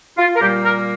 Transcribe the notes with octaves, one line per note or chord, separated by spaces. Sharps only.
F4
A#4
A#2 G3 A#3 G4
A#4